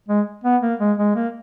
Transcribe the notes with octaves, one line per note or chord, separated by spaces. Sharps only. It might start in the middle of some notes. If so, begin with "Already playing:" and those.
G#3
B3
A#3
G#3
G#3
A#3